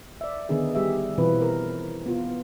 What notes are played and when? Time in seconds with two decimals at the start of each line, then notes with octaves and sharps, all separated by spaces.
0.21 D5 E5
0.49 D3 D#3 B3 D#4 G#4
0.75 G3 G4 G#4 E5
1.18 B2 E3 C4 F4 B4
1.41 A#4
2.06 B3 F4